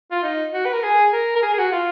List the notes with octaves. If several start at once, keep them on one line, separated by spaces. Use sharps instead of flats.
F4
D#4
F#4
B4
A#4
G#4
A#4
A#4
G#4
G#4
F#4
F4